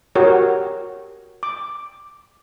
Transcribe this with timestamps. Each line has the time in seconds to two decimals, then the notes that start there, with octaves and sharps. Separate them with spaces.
0.15 F#4 G4 A#4 C#5
1.43 D6